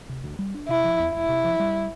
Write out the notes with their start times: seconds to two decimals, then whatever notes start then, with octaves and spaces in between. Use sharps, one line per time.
0.09 C3
0.24 D2
0.39 G3
0.54 D4
0.69 C3 E4
0.84 F3
1.00 E2
1.14 E1 E4
1.29 C3
1.44 F3
1.60 G3